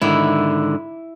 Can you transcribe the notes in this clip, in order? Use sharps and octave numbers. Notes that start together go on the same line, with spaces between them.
G#2 D3 D#3 E4